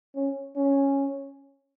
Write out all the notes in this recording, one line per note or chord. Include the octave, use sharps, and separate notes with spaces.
C#4
C#4